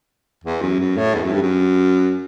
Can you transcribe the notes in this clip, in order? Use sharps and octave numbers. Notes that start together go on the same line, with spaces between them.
E2
F#2
F#2
A2
E2
F#2
G2
F#2